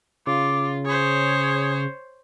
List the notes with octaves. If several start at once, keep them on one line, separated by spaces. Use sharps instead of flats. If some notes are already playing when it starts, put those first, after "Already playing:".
C#3 F4 D6
G#4 C5 C#5